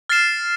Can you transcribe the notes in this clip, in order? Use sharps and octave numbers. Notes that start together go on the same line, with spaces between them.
F6 A6 C7 E7